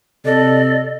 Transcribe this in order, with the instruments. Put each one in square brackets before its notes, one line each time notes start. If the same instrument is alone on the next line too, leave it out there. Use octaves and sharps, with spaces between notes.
[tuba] C3 [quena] A4 [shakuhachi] D5 [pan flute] D#5